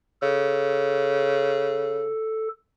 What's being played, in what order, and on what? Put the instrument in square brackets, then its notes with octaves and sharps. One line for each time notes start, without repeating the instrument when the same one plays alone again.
[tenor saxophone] C#3 [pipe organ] A4